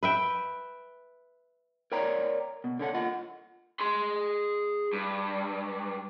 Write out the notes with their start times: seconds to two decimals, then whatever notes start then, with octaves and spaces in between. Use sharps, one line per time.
0.03 B4 E5 G5
1.92 A#4 C#5 D5 G5 A#5
2.64 B2
2.79 D3 C#4 A4 F#5
2.95 F4 D#5 F#5
3.80 G#4 C6
4.93 G2